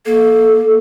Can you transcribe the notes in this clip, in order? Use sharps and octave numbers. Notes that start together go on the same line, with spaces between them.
A#3 A4